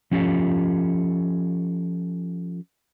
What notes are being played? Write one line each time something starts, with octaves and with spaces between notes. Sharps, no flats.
F3 C#4 F4 G4 A4